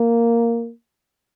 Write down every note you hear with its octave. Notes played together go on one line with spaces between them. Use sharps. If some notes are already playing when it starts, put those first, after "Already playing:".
Already playing: A#3